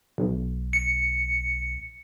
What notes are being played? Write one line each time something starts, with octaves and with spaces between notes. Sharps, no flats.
B1
C#7